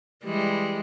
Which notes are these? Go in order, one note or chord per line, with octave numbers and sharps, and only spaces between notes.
E3 G3 G#3